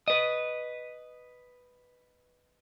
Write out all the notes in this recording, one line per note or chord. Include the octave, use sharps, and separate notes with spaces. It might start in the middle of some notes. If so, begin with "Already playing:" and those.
B4 D#5